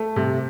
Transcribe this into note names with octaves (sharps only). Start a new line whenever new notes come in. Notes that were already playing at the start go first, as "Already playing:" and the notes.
Already playing: A3
C3